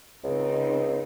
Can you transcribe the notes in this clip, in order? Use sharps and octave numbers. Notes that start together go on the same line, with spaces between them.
C#2 C#3 C4 D#4